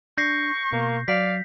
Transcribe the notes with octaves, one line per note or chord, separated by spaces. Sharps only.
D4 C#6 G6 A#6 C7
B2 A#3
F#3 D5 F5 B6